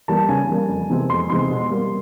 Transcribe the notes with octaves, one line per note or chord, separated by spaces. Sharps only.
E3 G3 A#3 A5
C#3 G#5
E3 G3 A#3
F2
C3 E3 G#3 C4
F2 C6
C3 E3 G#3 C4 C6
B2
G3 A#3